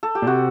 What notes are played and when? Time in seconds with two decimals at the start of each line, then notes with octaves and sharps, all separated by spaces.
0.03 A4
0.15 G4
0.22 A#2
0.27 C3 F#4